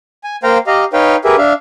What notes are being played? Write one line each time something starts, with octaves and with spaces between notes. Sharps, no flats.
G#5
A#3 C5 F5 G5 A#5
G4 D#5 F5 A#5
D#4 B4 C#5 F5 G5
G4 G#4 A#4 B4 E5
D4 E5 F5